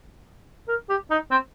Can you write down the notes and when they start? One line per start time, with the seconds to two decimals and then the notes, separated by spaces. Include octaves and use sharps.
0.68 A#4
0.89 G4
1.10 D#4
1.31 C4